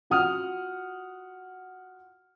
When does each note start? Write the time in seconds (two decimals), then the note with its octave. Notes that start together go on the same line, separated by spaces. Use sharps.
0.10 F4 F#4 F#5 D#6 F6